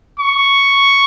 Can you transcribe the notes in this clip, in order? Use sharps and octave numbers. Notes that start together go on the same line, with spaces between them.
C#6